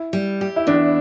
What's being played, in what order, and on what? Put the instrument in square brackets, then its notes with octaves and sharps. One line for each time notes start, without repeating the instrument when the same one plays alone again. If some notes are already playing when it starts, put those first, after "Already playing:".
Already playing: [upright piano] E4
[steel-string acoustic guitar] G3
G4
[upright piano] E4
[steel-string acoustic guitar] E2 [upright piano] D4